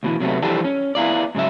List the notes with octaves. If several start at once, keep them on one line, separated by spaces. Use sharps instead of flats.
D2 B2 E3
C3 F#3 G3 A3 B3
E3 F3 G3 D4 G4 A4
C#4
B3 E4 F4 D5
G#2 C#3 F#3 E5